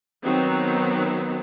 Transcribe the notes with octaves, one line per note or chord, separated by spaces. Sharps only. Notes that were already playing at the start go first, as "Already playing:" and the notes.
D#3 F#3 B3 C4 D#4